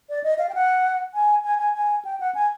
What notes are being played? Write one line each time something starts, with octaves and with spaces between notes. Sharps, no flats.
D5
D#5
F5
G5
F#5
G#5
G#5
G#5
G#5
G5
F#5
G#5